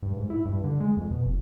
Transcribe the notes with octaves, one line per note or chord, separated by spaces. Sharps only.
G2
G#2
E4
G2
D3
G#3
F2
B2
F1